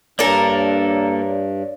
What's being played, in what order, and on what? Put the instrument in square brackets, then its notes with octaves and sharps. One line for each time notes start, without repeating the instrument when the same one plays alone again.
[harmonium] G2 [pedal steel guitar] A#3 A4 [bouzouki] D4 A#4 [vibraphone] C#5 D5